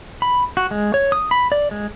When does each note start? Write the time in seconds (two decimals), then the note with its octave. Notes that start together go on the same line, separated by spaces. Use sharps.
0.22 B5
0.57 F#4
0.71 G#3
0.94 C#5
1.12 D#6
1.31 B5
1.52 D5
1.71 G#3